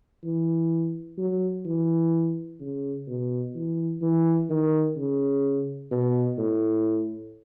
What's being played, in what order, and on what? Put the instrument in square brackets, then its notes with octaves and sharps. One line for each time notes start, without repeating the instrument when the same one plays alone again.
[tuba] E3
F#3
E3
C#3
B2
E3
E3
D#3
C#3
B2
A2